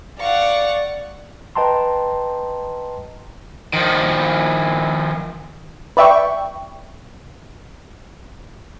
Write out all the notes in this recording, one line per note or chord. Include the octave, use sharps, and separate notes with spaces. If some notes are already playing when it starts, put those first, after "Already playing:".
D5 F5 F#5 C#6
B4 D#5 G5 A5 A#5 C6
D#3 F3
B4 D5 E5 G5 C#6